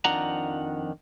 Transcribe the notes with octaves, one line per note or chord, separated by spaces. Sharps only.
F2 D#3 F3 D4 F#5 A#5